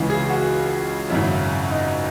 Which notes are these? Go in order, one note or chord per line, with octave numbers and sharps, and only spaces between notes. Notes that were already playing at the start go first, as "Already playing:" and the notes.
Already playing: C#2 C#3 E3
G#4
F#4
G#1 F#2 C#3 E4
D#4